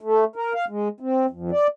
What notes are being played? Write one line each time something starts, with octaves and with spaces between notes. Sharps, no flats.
A3
A#4
F5
G#3
C4
F2
D5